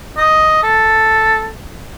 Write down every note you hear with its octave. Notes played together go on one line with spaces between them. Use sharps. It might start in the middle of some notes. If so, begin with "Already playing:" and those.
D#5
A4